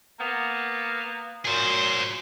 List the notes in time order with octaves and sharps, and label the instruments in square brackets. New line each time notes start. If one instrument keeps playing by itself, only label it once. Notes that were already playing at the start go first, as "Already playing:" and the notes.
[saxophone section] A#3 B3
[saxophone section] A#2 F#3 [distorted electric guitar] G#4 C5